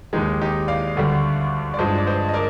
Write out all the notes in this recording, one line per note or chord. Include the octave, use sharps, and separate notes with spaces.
D#2 D#3 G#3 D#4 G4
D#4 G4
D5 F5
D2 D3 G3
D5
G2 F3 G#3 C5 D#5
D5
C5 D#5
D#5
A#4 D5